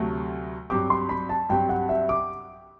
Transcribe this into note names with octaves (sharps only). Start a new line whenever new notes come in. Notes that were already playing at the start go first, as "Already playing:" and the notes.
Already playing: D2 C3 F#3 A3
G2 F#3 C4 G4 D6
C6
B5
A5
G2 F#3 C4 G4 G5
F#5
E5
D6